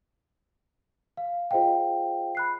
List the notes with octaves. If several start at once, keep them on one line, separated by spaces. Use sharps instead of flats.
F5
F4 G#4 C5 D#5 F5 G5
B5 F#6 C7